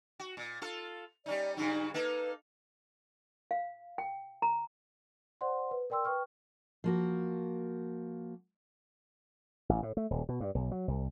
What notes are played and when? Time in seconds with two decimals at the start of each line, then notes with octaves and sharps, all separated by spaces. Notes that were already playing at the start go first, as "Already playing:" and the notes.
0.19 F#4
0.37 A#2
0.62 F4 A4
1.26 G3 C#4 D#4 D5
1.57 G2 C#3 F#3 D#4
1.94 A#3 D#4 A4 B4
3.51 F5
3.98 G5
4.42 A#5
5.41 C5 D5 F#5 C6
5.71 B4
5.90 A#4 D5 G5 C6 E6
6.05 B4 G5 C#6 F6
6.84 F3 A#3 F#4
9.69 A1
9.83 A2
9.97 A3
10.10 D#1
10.29 B2
10.40 G2
10.55 B1
10.71 F#3
10.88 C2